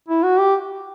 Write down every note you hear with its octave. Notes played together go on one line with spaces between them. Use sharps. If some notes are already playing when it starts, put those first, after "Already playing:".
E4
F#4
G4